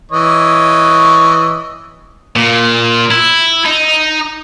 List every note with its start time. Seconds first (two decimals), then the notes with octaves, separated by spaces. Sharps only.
0.12 E3 C#5 D#5
2.36 A#2
3.11 E4
3.66 D#4